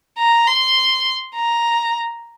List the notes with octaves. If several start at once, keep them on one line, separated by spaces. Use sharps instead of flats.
A#5
C6
A#5